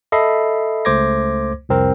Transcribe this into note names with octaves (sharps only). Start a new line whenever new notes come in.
A4 D#5 E5 B5 C7
C#2 A3 C5 D6 G#6 A#6
C2 F2 C4 A#4